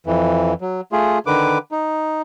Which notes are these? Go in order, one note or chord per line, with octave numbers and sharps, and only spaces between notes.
F2 E3
F#3
A3 F4 G#4
D3 D#3 B4 D6
D#4